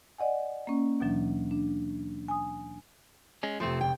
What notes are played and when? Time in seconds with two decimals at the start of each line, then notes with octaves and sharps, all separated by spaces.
0.18 D5 D#5 F#5 G#5
0.67 A#3 C#4
1.00 D#2 B2 E3 F#3 D4
1.51 D4
2.28 G#5 D#6
3.43 G#3 C#4
3.60 F1 F3 A3 C4 C6
3.81 C#2 G5